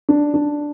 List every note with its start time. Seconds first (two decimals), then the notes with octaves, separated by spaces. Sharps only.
0.09 D4
0.34 D4